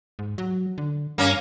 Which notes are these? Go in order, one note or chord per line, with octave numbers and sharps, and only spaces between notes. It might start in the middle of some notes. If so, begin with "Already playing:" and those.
G#2
F#3
D3
G2 A#3 C#4